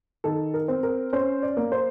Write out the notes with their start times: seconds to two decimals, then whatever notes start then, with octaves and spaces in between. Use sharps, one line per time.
0.24 D#3 A4
0.54 A#4
0.68 C4
0.83 A#4
1.13 C#4 C5
1.42 D5
1.57 A#3
1.72 C5